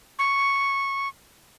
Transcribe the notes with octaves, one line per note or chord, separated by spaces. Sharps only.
C#6